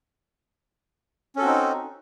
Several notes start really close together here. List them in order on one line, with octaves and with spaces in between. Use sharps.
C#4 A4 F#4 C4 D#4